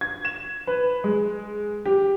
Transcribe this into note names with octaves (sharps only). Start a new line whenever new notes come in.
G#6
E7
B4
G#3
G4